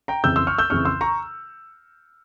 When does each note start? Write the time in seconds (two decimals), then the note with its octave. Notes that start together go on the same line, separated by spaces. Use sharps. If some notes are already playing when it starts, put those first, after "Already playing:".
0.08 G5 A#5
0.24 F2 C#3 E3 E6 G6
0.36 C6 E6
0.47 C#6 F6
0.58 E6 G6
0.70 F2 C#3 E3 C#6 F6
0.85 C6 E6
1.01 A#5 C#6